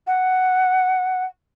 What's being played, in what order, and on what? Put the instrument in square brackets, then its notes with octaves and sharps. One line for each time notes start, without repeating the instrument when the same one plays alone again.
[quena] F#5